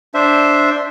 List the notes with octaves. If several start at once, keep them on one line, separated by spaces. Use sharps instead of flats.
D4 C5 E5